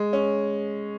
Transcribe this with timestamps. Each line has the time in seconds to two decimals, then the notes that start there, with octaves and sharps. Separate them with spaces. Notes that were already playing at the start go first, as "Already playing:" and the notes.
Already playing: G#3
0.13 C#4